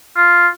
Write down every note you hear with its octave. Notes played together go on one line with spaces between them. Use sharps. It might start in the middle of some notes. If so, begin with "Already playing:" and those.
F4